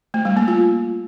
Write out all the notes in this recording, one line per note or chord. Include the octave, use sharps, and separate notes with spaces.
A3
G3
A#3
F4